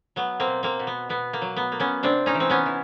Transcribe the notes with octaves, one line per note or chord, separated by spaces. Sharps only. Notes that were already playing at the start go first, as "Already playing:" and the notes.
F#3 B3
A#3 C4
B2
A#3 C4
B2
B3
B2 B3
A#3
F#3
B3
A#3
B3 C#4
C3 C4 D4
C#4 D#4
E3
C4
B3 C#4
E3